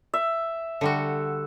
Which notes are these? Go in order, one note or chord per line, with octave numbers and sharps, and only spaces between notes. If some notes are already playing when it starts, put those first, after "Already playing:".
E5
D3 G3 F#4